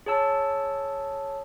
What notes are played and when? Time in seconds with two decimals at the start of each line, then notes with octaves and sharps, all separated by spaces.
0.06 G#4 C#5 A5 E6